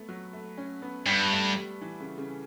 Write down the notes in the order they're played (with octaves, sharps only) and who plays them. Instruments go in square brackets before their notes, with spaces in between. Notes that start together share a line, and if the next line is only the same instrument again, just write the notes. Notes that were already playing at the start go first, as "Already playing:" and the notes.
Already playing: [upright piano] A3 B3
F#3
A3
C#4
B3
[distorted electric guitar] G2 [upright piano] B3
[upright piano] A3
G3
E3
C#3
C#3